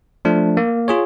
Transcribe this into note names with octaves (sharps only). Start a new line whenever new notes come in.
F3 A3 D4
A#3
F4 G#4 C#5